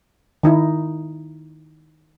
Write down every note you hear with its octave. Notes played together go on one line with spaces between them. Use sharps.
D#3 D#4 E4